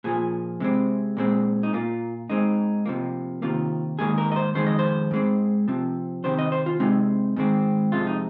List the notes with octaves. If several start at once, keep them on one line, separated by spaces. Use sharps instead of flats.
A#2 F3 A#3 G#4
C3 G#3 C4
A#2 G#3 C4
D#4
A#2 A#3 F4
G#2 G#3 C4 D#4
C3 F3 A#3
C3 D#3 A#3 F4
G#2 D#3 A#3 G#4
A#4
D#5
C5
F2 D#3 G#3 C5
D#5
C5
G#2 G#3 C4
C3 F3 C4
C3 D#3 C4 C5
D#5
C5
F4
C3 G#3 C4 D#4
G#2 D#3 G#3 C4
F2 C3 G#3 F4
D#4